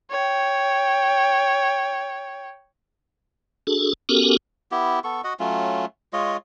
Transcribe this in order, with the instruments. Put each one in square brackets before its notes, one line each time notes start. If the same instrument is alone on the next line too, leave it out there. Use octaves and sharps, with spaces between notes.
[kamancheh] C#5 G5
[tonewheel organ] D4 F#4 G#4 A4
B3 C#4 F#4 G4 A4 A#4
[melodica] B3 E4 G4
B3 A4 C#6
F#4 D#5 F#5
F#3 A3 C#4 F4
G#3 F4 C#5 D#5